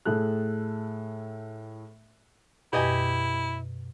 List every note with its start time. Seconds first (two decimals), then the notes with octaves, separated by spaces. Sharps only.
0.05 A2 G#4 A4 F#6
2.73 F#2 B2 E4 G4 D#5 G#5